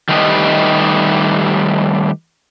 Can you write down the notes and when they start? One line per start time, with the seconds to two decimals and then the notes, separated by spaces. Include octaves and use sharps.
0.09 D#3 G3 A3 G4 B4 D#5